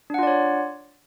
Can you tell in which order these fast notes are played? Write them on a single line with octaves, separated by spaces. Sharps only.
D4 F#5 F4 D5 C#5